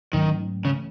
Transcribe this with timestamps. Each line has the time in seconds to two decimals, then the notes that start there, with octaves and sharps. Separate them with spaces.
0.13 G#2 D#3 F#3 A3 C#4
0.65 C#3 E3 A3 C#4